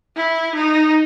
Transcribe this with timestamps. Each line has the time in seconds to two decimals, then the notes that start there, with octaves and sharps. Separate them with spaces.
0.16 E4
0.55 D#4